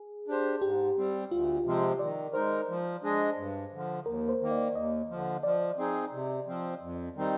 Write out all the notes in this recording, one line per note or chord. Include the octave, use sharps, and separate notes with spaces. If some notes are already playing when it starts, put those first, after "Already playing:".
Already playing: G#4
D4 G4 C5
G#2 G4
G3 C4
D2 F4
C3 F3 G#3 C4
D#3 D5
G#3 D#4 A#4 C5
F3
G#3 D4 G#4 D#5
G2
D3 F3
D#2 A#4
C5
D#3 A#3
D5
D#2 D#5
D3 F3
F3 D5
C4 D#4 G#4
C3
F3 C4
F2
D#3 G3 C4 D#4